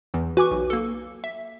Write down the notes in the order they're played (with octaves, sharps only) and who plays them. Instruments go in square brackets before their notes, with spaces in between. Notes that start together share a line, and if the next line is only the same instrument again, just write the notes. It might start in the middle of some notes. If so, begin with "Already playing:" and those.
[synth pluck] E2 E3
[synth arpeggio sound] F#4 G#5 D6 [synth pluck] B4 C#6
[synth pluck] B1
A#3 A4
E5